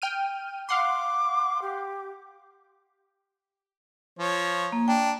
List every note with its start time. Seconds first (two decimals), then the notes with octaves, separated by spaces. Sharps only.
0.02 G5 F6 D#7
0.69 F5 F#5 C6 D6
1.62 G4
4.19 F3 C#5
4.72 A#3
4.88 D4 G5